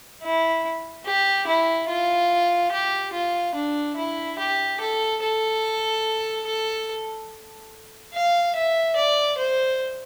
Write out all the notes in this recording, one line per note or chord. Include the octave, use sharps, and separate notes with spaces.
E4
G4
E4
F4
G4
F4
D4
E4
G4
A4
A4
A4
F5
E5
D5
C5